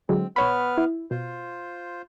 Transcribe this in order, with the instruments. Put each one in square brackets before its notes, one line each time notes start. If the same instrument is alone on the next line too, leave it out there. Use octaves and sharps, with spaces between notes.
[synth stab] D3 F#3 G#3 [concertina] C4
[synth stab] B1 C#5 B5 [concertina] B3 B4 F6
[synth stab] E4
[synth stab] B2 [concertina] F4 C5